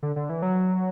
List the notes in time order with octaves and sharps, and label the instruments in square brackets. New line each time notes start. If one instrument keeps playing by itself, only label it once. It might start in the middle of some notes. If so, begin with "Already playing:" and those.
[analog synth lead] D3
D3
E3
F#3